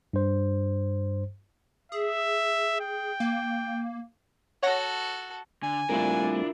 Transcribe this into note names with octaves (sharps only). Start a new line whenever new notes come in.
G2 C5
G#4 E5
G5
A#3
F#4 A4 C#5 F#5 A#6
D3 G#5
G3 A3 C4 D4 E4 F4 A#4